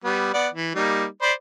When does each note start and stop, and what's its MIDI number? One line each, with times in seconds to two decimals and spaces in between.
0.04 0.33 55
0.04 0.33 59
0.34 0.48 59
0.34 0.48 74
0.34 0.48 78
0.53 0.74 52
0.75 1.05 55
0.75 1.05 58
0.75 1.05 63
1.22 1.33 72
1.22 1.33 74
1.22 1.33 83